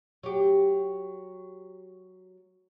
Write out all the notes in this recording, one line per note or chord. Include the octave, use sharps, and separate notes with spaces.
F#3 G4